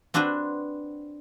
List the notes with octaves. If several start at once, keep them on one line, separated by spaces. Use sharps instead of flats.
C4 D4 F#4 B4 C5